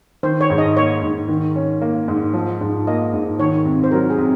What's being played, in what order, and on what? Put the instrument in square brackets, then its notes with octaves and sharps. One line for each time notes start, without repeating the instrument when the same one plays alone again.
[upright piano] D#3 [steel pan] C5
[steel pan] C#5
[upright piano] G#2
[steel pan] D#5
[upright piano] A#3 [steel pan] C#5
[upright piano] G#2
D#3
C#4
A#3
G#2
F3
G#2
[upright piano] A#3 [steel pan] D#5
[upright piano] G#2
[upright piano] D#3 [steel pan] C#5
[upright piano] C3
[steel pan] C5
[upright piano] F#3 [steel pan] A#4
[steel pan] G#4
[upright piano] C3